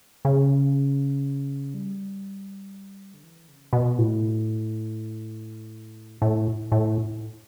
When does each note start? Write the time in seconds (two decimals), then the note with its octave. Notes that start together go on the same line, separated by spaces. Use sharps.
0.25 C#3
1.74 G3
3.14 D3
3.24 E3
3.48 C#3
3.73 B2
3.98 A2
6.22 A2
6.72 A2